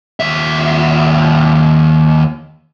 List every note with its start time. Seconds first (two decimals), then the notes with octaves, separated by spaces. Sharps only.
0.20 D#2 E5